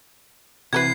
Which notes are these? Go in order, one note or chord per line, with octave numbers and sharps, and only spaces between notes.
C3 E3 F#4 A#4 B4 G#6 C7